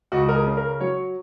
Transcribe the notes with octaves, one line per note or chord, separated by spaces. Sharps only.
C#2 F#4
A#4
G#4
C#3
A#4
F#3 C#5